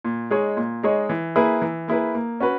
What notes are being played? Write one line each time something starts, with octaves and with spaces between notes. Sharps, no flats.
A#2
G#3 D#4 G#4 C#5
A#2
G#3 D#4 G#4 C#5
E3
A#3 E4 G#4 B4
E3
A#3 E4 G#4 B4
A#3
C#4 F#4 B4